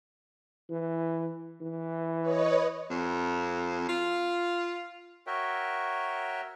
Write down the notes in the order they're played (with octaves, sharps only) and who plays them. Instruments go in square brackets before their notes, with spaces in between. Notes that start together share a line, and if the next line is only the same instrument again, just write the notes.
[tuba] E3
E3
[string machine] B4 C#5 D#5
[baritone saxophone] F2
F4
[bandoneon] F#4 A#4 C#5 E5 G5